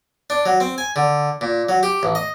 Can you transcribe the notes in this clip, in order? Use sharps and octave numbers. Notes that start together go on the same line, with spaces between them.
D4
F#3
C4
G#5
D3
A#2
F#3
G4
A1
D#5